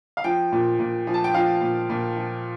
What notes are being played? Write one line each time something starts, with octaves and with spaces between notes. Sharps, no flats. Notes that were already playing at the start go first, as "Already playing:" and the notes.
F5
F3 G5
A#2
A#2
F3
A5
G5
F3 F5
A#2
A#2
F3